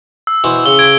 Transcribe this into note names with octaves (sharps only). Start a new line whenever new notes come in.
E6
B2 E3 C5
C#3 G7
G#6 D7